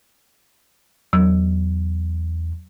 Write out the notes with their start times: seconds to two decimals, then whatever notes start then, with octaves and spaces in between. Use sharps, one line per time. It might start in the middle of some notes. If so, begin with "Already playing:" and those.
1.13 E2 F#3